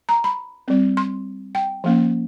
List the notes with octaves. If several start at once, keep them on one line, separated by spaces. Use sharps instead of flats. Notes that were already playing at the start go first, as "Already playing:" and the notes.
A#5
B5
G3 C4
C6
G5
F3 A#3 C#4